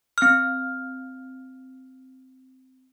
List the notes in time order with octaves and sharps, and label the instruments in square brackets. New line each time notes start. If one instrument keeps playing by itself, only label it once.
[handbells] C4 F6